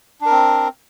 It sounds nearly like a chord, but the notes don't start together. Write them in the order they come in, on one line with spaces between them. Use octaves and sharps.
D4 A#4 C4